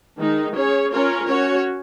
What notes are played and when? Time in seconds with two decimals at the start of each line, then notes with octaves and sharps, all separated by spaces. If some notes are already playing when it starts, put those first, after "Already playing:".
0.18 D#3 G#3 D#4
0.55 C#4 G#4 C#5
0.92 C#4 F4 A#4 C#5
1.28 C#4 F#4 C#5